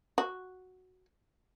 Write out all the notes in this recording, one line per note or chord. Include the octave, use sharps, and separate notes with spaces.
F#4